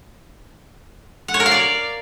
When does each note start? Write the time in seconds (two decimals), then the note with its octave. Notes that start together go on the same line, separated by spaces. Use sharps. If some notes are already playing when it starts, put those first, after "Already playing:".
1.28 F#5
1.34 C#5
1.40 A#4
1.46 F5
1.51 D5